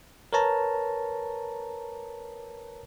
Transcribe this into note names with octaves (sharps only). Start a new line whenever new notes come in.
A#4 B4 C#5 A5 A#5